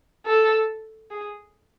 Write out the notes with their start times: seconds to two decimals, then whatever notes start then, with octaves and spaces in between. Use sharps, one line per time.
0.26 A4
1.11 G#4